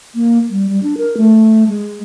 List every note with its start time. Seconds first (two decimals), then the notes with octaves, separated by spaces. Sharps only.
0.15 A#3
0.50 G3
0.69 G3
0.83 D4
0.98 A#4
1.17 A3
1.68 G#3